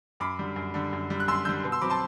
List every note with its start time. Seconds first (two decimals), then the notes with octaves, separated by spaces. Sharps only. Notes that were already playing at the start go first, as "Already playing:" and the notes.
0.20 F#2 B5 D6
0.39 D3 G3
0.56 F#2
0.74 D3 G3
0.93 F#2
1.10 D3 G3
1.20 F#6
1.28 F#2 C6 E6
1.45 D3 G3 E6 G6
1.64 B2
1.72 C6 E6
1.82 F#3 C4 B5 D6
1.90 A5 C6